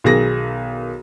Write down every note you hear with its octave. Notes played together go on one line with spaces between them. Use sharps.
B1 D#3 G#4 A#6